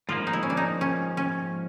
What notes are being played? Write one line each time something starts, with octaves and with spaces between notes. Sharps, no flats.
G#2 F3 A#3 F4
D#4
E4
C#4
D4
D#4
C#4
C#4